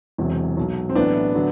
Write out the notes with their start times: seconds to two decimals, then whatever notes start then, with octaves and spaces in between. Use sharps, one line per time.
0.18 E1 E2 C3 F#3
0.57 B1 B2 F#3
0.89 C4
0.95 A1 A2 F#3 B3 D4
1.35 D3 F#3